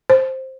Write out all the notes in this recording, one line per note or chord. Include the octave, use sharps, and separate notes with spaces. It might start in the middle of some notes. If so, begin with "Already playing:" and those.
C5